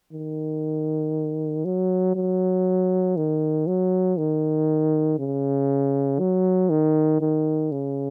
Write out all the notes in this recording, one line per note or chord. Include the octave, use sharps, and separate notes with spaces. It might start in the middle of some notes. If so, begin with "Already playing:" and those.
D#3
F#3
F#3
D#3
F#3
D#3
C#3
F#3
D#3
D#3
C#3